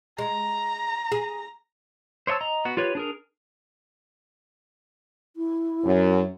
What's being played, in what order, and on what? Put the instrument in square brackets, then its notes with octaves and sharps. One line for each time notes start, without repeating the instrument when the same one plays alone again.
[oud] G#3 [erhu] A#5
[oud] G#4
[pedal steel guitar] C5 C#5 D#5 A5 E6
D#5 A#5
B3 F#4
F4 G4 B4 C#5
D4 G#4 A#4
[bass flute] E4
[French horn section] F#2